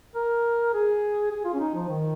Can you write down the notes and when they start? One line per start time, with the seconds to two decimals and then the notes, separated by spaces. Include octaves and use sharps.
0.15 A#4
0.74 G#4
1.31 G#4
1.45 F4
1.54 C#4
1.60 D#4
1.75 F3
1.88 D#3